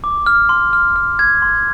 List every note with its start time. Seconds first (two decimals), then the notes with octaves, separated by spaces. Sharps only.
0.04 D6
0.26 F6
0.49 C6
0.73 F6
0.96 F6
1.19 G#6
1.42 C6